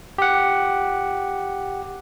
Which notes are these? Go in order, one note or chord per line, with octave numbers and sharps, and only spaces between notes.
G4 F#5